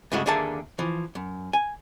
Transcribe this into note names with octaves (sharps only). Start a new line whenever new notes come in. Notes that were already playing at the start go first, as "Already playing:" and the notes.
G2 C#3 G#3 A3 F#4
D#2 D3 A#3 G#4 E5 A5
E3 F3
F#2
G#5